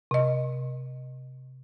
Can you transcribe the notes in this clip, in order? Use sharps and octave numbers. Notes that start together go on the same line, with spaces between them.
C3 D#5